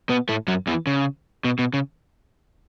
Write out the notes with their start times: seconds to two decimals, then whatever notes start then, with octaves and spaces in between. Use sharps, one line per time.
0.09 B2 B3
0.29 A2 A3
0.48 F#2 F#3
0.67 E2 E3
0.87 C#3
1.44 B2
1.59 B2
1.73 C#3